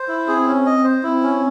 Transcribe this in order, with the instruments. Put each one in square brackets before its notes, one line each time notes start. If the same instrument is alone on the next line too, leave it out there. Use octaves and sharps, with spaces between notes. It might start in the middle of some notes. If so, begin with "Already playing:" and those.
Already playing: [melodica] C5
E4
[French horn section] C4 [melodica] G#4
[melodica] C#4
D#5
C5
[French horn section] C4 [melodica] E4
[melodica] C#4